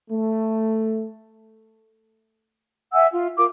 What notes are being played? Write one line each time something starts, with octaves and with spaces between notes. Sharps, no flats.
A3
E5 F#5 G#5 E6
F4
F4 A#4 D6